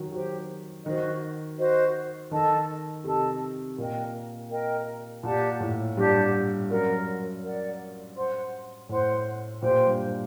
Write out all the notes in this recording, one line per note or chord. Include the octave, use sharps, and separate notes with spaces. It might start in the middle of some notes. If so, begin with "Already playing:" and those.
Already playing: D#3 F#3
F#3 G4 C5 G5
D#3 F#4 C5 D#5
F#4 C5 D#5
D#3 A4 D#5 A5
C3 A4 D#5 A5
A#2 A#4 D#5 G5
A#4 D#5 G5
A#2 G4 D5 F#5 A5
A2
G2 G4 D5 F#5 A5
F#2 A#4 D5 F#5
A#4 D5 F#5
C5 F#5 C6
A2 C5 F#5 C6
A#2 G4 C5 G5
G2